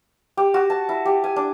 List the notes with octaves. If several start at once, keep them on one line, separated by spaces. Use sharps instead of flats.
G4
F#4
A5
E4
G4
G#5
D4